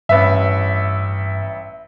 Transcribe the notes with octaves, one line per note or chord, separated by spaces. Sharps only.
A1 G2 B4 E5